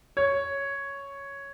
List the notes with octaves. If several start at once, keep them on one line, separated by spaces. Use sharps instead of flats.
C#5